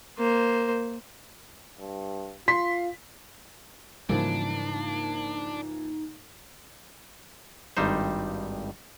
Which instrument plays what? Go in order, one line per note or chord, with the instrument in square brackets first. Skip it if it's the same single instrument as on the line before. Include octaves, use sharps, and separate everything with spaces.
[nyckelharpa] A#3 C5
[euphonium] G2
[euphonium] F4 [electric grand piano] C6 [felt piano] B6
[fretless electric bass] G#2 C#3 G3 [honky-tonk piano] E3 F3 A#3 [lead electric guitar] D4 [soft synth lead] D#4
[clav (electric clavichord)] G#1 G2 G3 D#4 C5